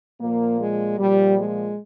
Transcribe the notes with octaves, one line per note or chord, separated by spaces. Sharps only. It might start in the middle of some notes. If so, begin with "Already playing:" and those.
A#2 F3 A#3
G#3
A#2 F3 G3
G#3